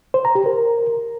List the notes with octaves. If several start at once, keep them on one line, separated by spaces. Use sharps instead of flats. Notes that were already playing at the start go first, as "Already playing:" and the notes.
C5
A#5
G4
A#4